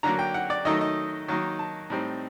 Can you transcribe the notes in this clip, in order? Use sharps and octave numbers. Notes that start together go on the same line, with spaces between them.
D3 F#3 A#3 A#5
G5
F#5
D5
D#3 F#3 A3 D#4 D#5
D#5
D#3 F#3 A#3 D#4
A5
A2 G3 C4 D#4